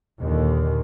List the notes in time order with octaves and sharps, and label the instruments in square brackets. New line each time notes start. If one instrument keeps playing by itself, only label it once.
[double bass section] D#2 A#2 D3 D#3